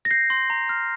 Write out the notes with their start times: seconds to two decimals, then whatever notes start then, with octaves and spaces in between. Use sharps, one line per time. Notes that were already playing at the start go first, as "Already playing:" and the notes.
0.05 A#6
0.11 G6 C7
0.30 C6
0.50 A#5
0.69 F6